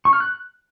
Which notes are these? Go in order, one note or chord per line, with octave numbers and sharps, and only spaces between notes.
C#6
F6
F#6